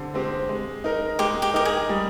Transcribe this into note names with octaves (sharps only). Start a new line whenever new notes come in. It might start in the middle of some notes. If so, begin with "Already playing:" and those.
Already playing: D3 C4 G4
G#3 C4 G4
G#3
D#4 A#4
G#3 G4
G4
D#4 G4 A#4
G#4
G3